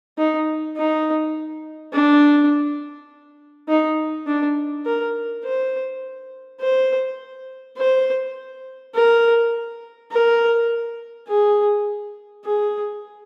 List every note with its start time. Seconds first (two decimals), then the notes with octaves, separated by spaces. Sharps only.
0.18 D#4
0.77 D#4
1.93 D4
3.69 D#4
4.27 D4
4.86 A#4
5.44 C5
6.60 C5
7.77 C5
8.94 A#4
10.11 A#4
11.28 G#4
12.45 G#4